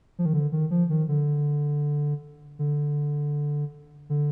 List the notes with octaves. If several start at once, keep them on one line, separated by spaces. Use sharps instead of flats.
F3
D#3
D3
D#3
F3
D#3
D3
D3
D3